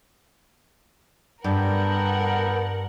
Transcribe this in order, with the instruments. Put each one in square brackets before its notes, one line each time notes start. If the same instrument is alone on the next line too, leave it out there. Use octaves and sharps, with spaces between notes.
[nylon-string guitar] G2 [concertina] B3 A4 G5 [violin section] A#4 F#5